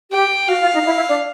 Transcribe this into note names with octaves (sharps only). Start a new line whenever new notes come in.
G4 G5
F#4 F5
F4
D#4
E4
E4
D4